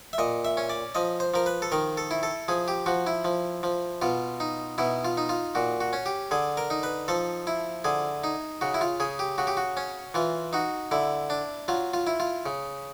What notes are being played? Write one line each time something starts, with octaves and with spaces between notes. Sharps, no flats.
E5
A#2 D#5
E5
C#4
D5
F3 D#5
C5
F3 A#4
B4
A4
D#3 A#4
A4
E4
A4
F3 G#4
G4
F3 F#4
E4
F3
F3
B2 F4
D#4
B2 E4
F4
D#4
F4
A#2 F#4
F#4
C#4
G4
D3 G#4
A#4
D#4
B4
F3 A4
E4
D3 G#4
D#4
C#3 F#4
E4
F4
C#3 G#4
G4
C#3 F#4
G4
F#4
C#4
E3 F4
D#4 F#4
D3 E4
D4
F#3 F4
F4
E4
F4
C#3